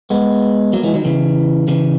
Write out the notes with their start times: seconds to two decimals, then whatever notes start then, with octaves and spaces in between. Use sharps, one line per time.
0.10 G#3 B3
0.73 F#3 A#3
0.83 E3 G#3
0.94 D#3 F#3
1.05 C#3 E3
1.68 C#3 E3